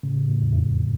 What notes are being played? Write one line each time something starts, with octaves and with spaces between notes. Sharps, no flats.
A2 C#3
A2
E2
F2